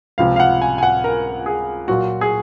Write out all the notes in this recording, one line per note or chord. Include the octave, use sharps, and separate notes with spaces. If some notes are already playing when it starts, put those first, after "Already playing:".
C#2 C3 F3 F5
F5
F#5
G#5
G#5
F#5
A#4
G#4
A#2 F#3 A#3 F4 F#4
G#4